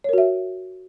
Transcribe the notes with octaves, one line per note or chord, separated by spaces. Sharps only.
F#4 A#4 C#5 E5